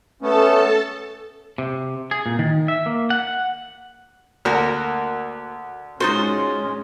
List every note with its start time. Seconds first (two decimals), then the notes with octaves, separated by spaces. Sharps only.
0.22 A3 B3 C#4 A4 A5
1.58 C3
2.11 G#4
2.26 A#2
2.39 D#3
2.68 E5
2.86 A#3
3.10 F#5
4.45 D2 A#3 F#4 A#4
6.00 G#3 C#4 D#4 F4 F#4 C5